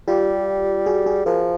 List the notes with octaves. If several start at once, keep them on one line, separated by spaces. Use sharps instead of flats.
G3 F4 G4
F#4 G#4
F#4 G#4
F3 G#4 A#4